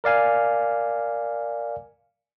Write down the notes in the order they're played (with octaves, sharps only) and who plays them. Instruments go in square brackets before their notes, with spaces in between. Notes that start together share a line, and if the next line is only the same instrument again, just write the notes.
[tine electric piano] A#4 D5 F5 G#5